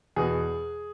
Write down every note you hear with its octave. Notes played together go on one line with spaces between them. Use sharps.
E2 B2 G#4